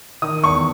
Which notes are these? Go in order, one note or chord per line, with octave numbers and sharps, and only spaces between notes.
D#3 D#6
E2 C#6